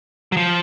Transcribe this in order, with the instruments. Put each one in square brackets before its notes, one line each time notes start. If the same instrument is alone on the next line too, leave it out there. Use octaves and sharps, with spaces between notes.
[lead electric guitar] F#3
F3